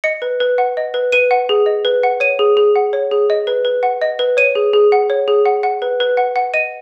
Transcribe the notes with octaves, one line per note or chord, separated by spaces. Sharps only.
D#5 C#7
B4
B4
F#5
D#5
B4
B4 D#7
F#5
G#4
D#5
B4
F#5
C#5 D#7
G#4
G#4
F#5
C#5
G#4
D#5
B4
B4
F#5
D#5
B4
C#5 D#7
G#4
G#4
F#5
C#5
G#4
F#5
F#5
B4
B4
F#5
F#5
D#5 D#7